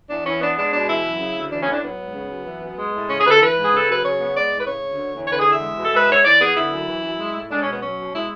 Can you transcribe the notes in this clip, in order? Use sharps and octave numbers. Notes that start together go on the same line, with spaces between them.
E2 D4
E3 C#4
B3 D4
G#3 D4
B2 D4
E3 E4
F#2
C#3
D2
E3 D4
C#4
A2
D4
F#3 B3
G#2
C#3
F#2
E3
F#2
G#3
A2
C#3 C#4
G#4
D2 B4
A4
E3 B4
G#2
G#4
C#3
A4
F#2 B4
C#3 C#5
B3
G#3 D5
A2
B4
C#3 C#5
D2
D3
E2
C#5
D3 B4
G#4
E2
E5
G#3
B2
A4
G#3 B4
G#2 C#5
E3 D5
B3 G#4
D3 E4
F#2
E3
F#2
G#3
A2
G#3 D4
C#4
B2
B3
F#3 C#4
B2
G#3 E4